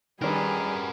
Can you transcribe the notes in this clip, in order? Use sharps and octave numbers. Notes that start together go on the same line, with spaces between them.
D#3 G3 D4 F#4 G#4 A#4 B4